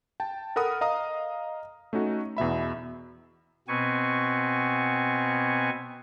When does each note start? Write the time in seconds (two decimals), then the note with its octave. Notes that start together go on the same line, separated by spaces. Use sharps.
0.20 G5 A5
0.56 A4 A#4 F#5 B5 D#6 F6
0.81 D#5 F5 A#5 D#6
1.93 A3 C#4 D#4 F#4
2.37 E2 B2 E5 B5
3.68 B2 B3 C4 G#5 C#6